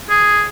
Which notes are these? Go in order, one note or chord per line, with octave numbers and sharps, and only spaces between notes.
G#4